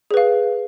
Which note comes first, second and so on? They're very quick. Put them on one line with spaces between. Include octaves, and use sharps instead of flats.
G#4 B4 F5